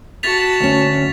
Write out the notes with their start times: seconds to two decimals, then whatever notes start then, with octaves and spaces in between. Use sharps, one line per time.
0.23 F#4 A5 A6 B6 F7
0.60 D2 C#4